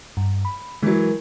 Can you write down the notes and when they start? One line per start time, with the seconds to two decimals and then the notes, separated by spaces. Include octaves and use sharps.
0.17 G2
0.45 B5
0.83 E3 F#3 G#3 A#4